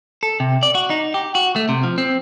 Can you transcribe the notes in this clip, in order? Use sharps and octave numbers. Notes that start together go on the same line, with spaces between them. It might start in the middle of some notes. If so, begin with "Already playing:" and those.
A4
C3
D5
F#4
D#4
G4
F#4
A3
C3
F3
C4